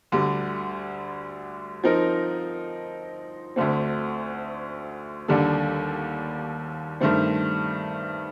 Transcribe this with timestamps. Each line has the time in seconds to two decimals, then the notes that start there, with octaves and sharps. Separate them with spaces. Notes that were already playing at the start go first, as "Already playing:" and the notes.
0.12 D2 D3 G3
1.84 F3 C4 D#4 A#4
3.56 D2 D3 A3 C4
5.28 D#2 D3 G3 D4 A4
7.00 G2 D#3 A3 C4